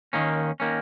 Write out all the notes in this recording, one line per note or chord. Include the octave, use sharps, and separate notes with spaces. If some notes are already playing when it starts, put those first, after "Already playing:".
D#2 D#3 A#3 C#4
D#3 A#3 C#4